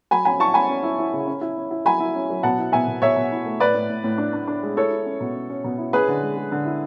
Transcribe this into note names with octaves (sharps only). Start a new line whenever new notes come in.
F#3 G#5 B5
C#4 G#5 B5
E4 A5 C#6
C#4 G#5 B5
C#4
E4
E4
C#3
C#4
E4
C#4
E4
F#3 G#5 B5
E4
C#4
F#3
B2 F#5 A5
E4
B2 E5 G#5
B2
B2 C#5 E5
B2
E4
A3
A2 B4 D5
A2
A2
A2
D4
D4
D4
G#3
E4 A4 C#5
E4
C#4
B2
C#4
C#4
B2
E4
C#4 G#4 B4
D3
G#3
G#3
D3
E4